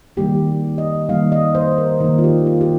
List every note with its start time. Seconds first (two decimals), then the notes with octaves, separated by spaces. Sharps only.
0.17 D#3 G3 A#3 G4
0.78 D#5
1.09 D#3 G3 A#3 F5
1.32 D#5
1.55 C5
1.78 A#4
2.00 D#3 A#3 A#4
2.18 F4
2.24 G4
2.47 F4
2.61 G4